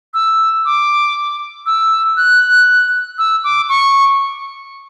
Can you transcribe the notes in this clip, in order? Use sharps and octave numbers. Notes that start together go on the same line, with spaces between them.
E6
D6
E6
F#6
E6
D6
C#6